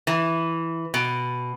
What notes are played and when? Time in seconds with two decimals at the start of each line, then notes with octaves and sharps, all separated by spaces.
0.07 E3
0.94 B2